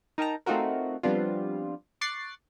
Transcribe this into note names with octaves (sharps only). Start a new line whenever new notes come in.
D#4 A#4 G5 A5 A#5
A3 C4 D#4 F4 F#4 A#4
F3 G3 B3 C4 D4 F4
C#6 D6 F#6 A6 C7